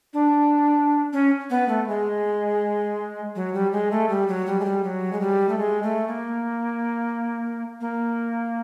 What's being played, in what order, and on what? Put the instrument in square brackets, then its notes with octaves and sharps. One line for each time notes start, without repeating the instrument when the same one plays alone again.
[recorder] D4
C#4
B3
A3
G#3
F#3
G3
G#3
A3
G3
F#3
G3
G#3
G3
F#3
G#3
G3
A3
G#3
A3
A#3
A#3